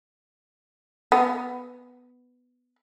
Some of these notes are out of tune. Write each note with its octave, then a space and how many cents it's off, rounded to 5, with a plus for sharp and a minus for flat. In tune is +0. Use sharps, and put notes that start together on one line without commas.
B3 +5